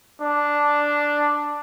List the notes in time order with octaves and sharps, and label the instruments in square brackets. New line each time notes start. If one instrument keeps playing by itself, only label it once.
[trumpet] D4